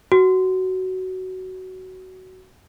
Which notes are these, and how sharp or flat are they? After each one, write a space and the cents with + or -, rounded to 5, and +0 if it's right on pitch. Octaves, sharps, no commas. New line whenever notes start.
F#4 +15